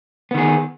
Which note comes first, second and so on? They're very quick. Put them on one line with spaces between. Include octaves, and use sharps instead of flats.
B3 D#3 G#4